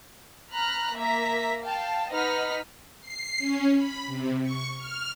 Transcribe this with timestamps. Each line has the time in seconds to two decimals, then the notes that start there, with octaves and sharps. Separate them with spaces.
0.53 A#5 B5 F6 F#6
0.95 A#3 E5 A#5 B6
1.64 F5 G5 A5
2.10 D#4 B4 D#5 F#5 F6 B6
3.01 C7
3.37 C#4
3.75 B5
4.07 C3
4.42 C#6
4.76 F6